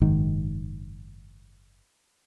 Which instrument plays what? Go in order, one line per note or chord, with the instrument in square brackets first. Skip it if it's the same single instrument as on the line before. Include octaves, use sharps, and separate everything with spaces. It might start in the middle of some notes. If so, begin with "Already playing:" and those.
[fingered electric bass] F#1 G#2 D#3